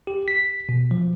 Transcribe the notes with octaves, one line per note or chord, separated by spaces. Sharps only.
G4
B6
B2
F3